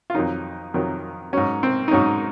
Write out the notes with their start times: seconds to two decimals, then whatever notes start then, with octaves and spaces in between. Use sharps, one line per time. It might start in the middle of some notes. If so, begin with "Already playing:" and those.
0.10 F4
0.15 F2 D#3 F#3 D#4
0.74 F2 D#3 F#3
1.33 G#2 F#3 C#4
1.63 C4
1.88 D#4
1.91 G#2 F#3 C#4